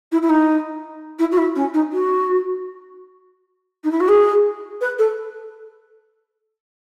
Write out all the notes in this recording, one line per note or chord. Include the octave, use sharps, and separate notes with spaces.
E4
E4
D#4
E4
F#4
E4
C#4
D#4
F#4
D#4
E4
F#4
G#4
B4
A4